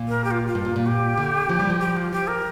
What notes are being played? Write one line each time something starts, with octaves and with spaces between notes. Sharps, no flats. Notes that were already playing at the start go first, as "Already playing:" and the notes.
Already playing: A#2
A#4
G4
F4
F4
G2
A#2
A#2
G4
D3
F3
G3
F3
G4
F4
F3 G4
A#4